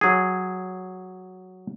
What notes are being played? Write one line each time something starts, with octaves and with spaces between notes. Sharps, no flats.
F#3 G#4